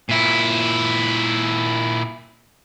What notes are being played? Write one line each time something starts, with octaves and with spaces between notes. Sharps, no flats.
A#2 E4